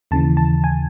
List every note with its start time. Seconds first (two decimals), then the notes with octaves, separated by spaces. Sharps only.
0.11 D#2 C#3 E3 A5
0.37 A5
0.64 G#5